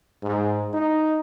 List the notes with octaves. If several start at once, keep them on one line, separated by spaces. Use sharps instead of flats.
G#2
D#4